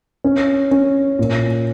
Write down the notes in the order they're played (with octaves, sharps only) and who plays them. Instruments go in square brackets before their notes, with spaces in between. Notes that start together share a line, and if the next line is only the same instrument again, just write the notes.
[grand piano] C#4
C#4
A#2